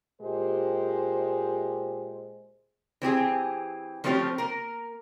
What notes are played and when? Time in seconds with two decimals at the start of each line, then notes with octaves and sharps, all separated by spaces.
0.21 A#2 G#3 G4 C5
3.02 E3 C4 G4 G#4
4.04 F3 A3 C4 C#4 F4 G4
4.38 A#3 A#4